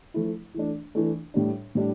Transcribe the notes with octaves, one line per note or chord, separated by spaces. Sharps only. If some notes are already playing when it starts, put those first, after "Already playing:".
F3 A3 E4
E3 A3 D4
E3 A3 D4
A2 G3 D4
A2 G3 D4